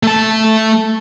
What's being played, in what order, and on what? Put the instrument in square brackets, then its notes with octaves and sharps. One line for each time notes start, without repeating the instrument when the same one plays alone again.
[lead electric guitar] A3 A5